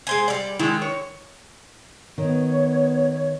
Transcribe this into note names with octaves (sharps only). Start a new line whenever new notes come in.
G#3 C5 G#5
G3 D5
D#3 G#3 E4
C#5
D#3 B3 C#5